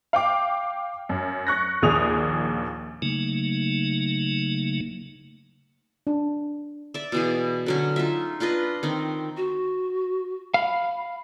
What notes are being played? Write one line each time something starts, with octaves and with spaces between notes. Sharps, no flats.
F5 G5 D6
F#2
C#6 F#6 A#6
A#1 D#2 G#4 D#6 F7
C#3 F#3 A3 A#3 D#4
D4
D5 E5
B2 E3 G#4
D3 F#3 C#4
D#4 F4 E5
D4 F4 B4 D#5
D#3 C4
F#4
F5 B5